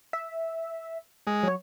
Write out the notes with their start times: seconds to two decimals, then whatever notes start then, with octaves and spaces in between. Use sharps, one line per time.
0.13 E5
1.27 G#3
1.43 F#3 C#5